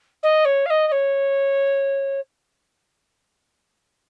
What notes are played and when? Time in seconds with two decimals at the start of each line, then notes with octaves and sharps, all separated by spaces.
0.23 D#5
0.45 C#5
0.66 F5
0.70 D#5
0.87 D#5
0.92 C#5